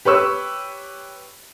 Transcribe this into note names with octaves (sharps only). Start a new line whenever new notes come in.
G4 B4 C#5 C#6 E6